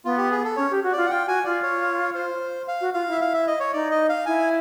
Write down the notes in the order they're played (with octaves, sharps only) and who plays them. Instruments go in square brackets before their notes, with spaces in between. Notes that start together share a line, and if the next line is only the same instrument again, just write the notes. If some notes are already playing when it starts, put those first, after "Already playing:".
[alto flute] B3 [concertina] F4
[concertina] G4
G#4
A4
[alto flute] C#4 [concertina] C#5
[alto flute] G4
F#4
[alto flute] F4 [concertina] D5
[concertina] F#5
[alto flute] F4 [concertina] G5
[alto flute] F#4 [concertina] G#5
[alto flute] F4 [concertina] D5
[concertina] C#5
C5
F5
[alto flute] F#4
[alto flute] F4 [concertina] F5
[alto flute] E4 [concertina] E5
[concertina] F5
E5
D#5
C#5
[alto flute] D#4 [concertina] D5
[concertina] D#5
F5
[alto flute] E4 [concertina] G#5